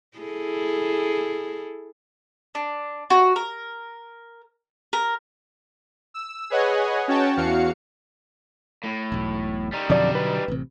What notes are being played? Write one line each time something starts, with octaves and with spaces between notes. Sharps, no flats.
E4 G#4 A4
D4
F#4
A#4
A#4
E6
G#4 B4 C#5 D#5 F#5 G#5
C#4 F#4 C#5 G5 A5
E2 F#4 F5 C#7
A2
E1 B1
G3 D#4
F2 B2 D3 F#3 D5 A5
B4
A1 C3